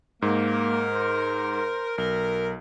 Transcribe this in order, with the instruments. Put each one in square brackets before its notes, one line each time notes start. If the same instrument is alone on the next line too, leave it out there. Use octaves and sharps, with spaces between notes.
[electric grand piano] G#2 [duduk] A#3 [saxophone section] A#4
[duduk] C5
[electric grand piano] B1 [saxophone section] A#4